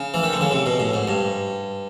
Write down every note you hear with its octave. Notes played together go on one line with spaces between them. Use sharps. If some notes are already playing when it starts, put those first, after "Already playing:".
Already playing: C#3
E3
D#3
D3
C#3
C3
B2
A2
G#2
G2